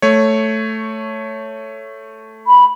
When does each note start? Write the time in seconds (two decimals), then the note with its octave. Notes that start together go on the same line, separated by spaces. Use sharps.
0.02 A3 C#5
2.47 B5